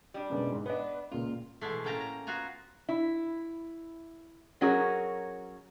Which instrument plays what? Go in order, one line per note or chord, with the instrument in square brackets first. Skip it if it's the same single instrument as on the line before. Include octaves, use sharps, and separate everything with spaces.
[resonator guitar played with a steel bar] G3 D4
[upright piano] F#2 B2 G#3
G#2
[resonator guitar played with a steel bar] B3 D4 [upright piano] B4 D#5
[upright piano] C#2 A#2 [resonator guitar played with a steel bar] F4
[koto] B2 E3 G#3 A3
A2 A#3 C#4 G5 A5 A#5
A#5
B3 F4 F#4 G#5 A#5
[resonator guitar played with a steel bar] E4
F#3 C#4 F#4 G#4 A#4